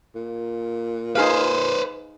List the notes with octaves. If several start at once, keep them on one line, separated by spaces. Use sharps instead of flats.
A#2
D#4 G#4 B4 C5 F5